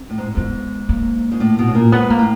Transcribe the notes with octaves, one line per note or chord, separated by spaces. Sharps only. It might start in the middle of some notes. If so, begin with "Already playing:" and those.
Already playing: C4
A2
G#2
G#2 B3
A#3
G#2
A2
B2
A2
A#2
G#2 B3
A#3
A2